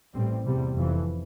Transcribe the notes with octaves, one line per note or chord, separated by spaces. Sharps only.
A1 A2 G3 C4
E2 C3 G3
F1 F2 E3